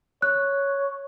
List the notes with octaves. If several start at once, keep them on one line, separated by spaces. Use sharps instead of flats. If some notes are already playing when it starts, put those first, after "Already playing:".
C#5 F#6